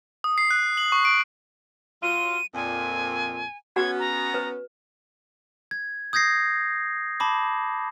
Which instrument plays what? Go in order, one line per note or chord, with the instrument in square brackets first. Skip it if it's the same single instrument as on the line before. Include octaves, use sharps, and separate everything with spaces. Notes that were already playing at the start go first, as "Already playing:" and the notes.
[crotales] D#6
C7
F#6
F#7
C#6
D7
[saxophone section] F#3 F4 [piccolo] D#7
[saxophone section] F2 A#2 [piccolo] G#5
[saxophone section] B3 C#4 [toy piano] F#4 G#4 F#5 [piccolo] G#6
[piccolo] A#5
[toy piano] B4
[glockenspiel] G#6
D#6 G6 G#6 A#6 C7
A5 B5 D6